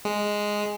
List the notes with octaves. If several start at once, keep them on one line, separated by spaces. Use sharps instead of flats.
G#3